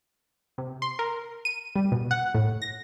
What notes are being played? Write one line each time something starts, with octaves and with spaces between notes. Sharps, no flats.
C3
C6
A#4
D#7
G3
B2
F#5
A2
A#6